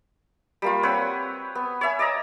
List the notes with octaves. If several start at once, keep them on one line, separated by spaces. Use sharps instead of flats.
G3 A#3 F4
C4 B4 C#5 F#5
B3
C#5 E5 G#5
D5 D#5 A#5 E6